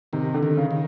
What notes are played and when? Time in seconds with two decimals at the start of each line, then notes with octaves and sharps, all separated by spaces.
0.13 C3 D#3
0.34 D3
0.43 D#3
0.57 C#3
0.71 D#3